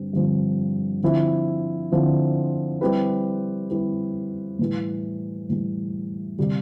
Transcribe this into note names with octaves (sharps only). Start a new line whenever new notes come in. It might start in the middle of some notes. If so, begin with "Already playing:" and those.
Already playing: G2 D3 C4
G2 D3 F3 C4
D3 F3 C4 E4
D3 F3 C4 E4
G3 C4 E4 G4 B4
G3 C4 E4 G4 B4
A2 E3 G3
A2 E3 G3
C3 G3